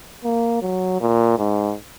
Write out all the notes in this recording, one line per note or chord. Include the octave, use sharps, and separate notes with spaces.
A#3
F#3
A#2
G#2